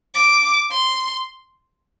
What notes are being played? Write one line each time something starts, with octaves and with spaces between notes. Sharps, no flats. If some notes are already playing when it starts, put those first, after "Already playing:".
D6
C6